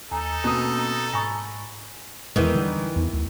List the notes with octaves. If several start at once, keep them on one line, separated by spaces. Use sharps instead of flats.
D#2 D#4 A4 G#5 A#5
B2 A#3 C4 C#4 D#6
A#5
G#2 G#5 A#5 B5 C#6 A6
E2 D#3 E3 G#3
D3 G3
E2
D2